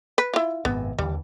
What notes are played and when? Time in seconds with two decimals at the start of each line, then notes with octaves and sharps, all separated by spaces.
0.18 B4
0.33 E4 F4
0.65 G#1 F#2 C3 B3
0.99 D#2 D3 E3 G3